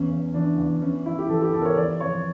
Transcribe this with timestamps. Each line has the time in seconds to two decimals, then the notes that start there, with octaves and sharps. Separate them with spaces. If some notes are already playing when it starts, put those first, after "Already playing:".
Already playing: E2 C#4
0.11 E2
0.34 E3 D4
0.58 E2
0.82 E3 C#4
1.05 E3 E4
1.18 G4
1.29 E3 A4
1.42 G4
1.54 E2 A4
1.61 A#4
1.65 C#5
1.77 E3 D5
2.00 F2 C#5